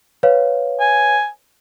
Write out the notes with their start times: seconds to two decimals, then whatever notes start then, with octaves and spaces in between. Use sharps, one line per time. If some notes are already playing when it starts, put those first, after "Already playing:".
0.23 B4 C#5 F5
0.80 G#5